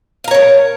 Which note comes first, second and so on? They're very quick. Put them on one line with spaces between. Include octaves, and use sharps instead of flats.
F5 A#5 C#5 A#4